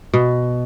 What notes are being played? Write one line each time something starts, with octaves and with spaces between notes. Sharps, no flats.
B2